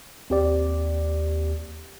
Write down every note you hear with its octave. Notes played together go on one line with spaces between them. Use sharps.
D#2 C4 G4 D5